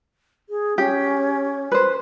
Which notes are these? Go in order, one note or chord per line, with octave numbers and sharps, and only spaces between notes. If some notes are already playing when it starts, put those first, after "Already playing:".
G#4
C#4 G4
B4 C5